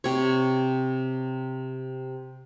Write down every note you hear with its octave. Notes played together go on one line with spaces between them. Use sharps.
C3 C#5